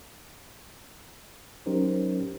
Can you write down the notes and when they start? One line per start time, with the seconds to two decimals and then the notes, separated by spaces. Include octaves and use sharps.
1.66 F#3 C#4 D#4 G4 A#4 C5